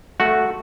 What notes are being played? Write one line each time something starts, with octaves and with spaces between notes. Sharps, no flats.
A3 F#4